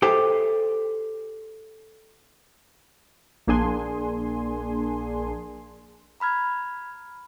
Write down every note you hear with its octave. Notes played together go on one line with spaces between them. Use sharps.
G4 A4 C5 E5 G5
A#1 A#3 D4 G#4 G#5 C6
A#5 B5 F6 G#6